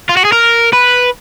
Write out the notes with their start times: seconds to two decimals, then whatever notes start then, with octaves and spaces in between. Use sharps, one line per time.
0.09 F4
0.17 F#4
0.25 G#4
0.32 A#4
0.73 B4